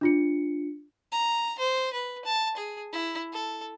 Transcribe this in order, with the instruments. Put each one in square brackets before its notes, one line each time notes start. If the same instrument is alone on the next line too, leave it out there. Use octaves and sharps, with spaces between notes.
[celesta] D4 F4 C#7
[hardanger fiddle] A#5
C5
B4
A5
G#4
E4
A4